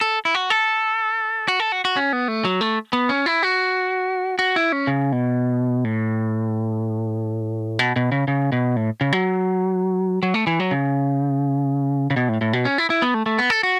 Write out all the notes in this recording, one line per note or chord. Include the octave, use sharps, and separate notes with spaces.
A4
E4
F#4
A4
F#4
A4
F#4
F#4
C#4
B3
A3
F#3
A3
B3
C#4
E4
F#4
F#4
E4
C#4
C#3
B2
A2
B2
B2
C#3
C#3
B2
A2
C#3
F#3
F#3
A3
E3
F#3
C#3
C#3
B2
A2
A2
B2
C#4
E4
E4
B3
A3
A3
B3
A4
F#4